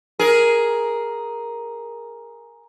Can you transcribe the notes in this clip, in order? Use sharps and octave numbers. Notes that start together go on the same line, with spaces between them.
G#4 A#4